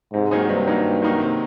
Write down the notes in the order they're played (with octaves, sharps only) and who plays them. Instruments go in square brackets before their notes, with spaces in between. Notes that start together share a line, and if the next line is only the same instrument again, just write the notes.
[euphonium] G#2 [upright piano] C3
[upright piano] D#3 F#3 A#3 D#4
[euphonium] G2 [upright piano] C3
[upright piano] D#3 F#3 A#3 D#4
C3
D#3 F#3 A#3 D#4
C3